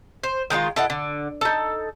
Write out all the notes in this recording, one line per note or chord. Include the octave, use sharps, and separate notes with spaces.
C5
D#3 G#3 D#4 F4
E4 A4 D#5 F#5
D3
D#4 A4